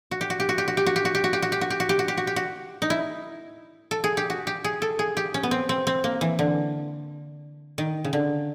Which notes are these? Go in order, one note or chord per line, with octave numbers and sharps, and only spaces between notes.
F#4
G4
F#4
G4
F#4
G4
F#4
G4
F#4
G4
F#4
G4
F#4
G4
F#4
G4
F#4
G4
F#4
G4
F#4
G4
F#4
G4
F#4
D#4
E4
A4
G#4
G4
F#4
G4
G#4
A4
G#4
G4
C#4
B3
C4
C4
C4
A#3
E3
D3
D#3
C#3
D3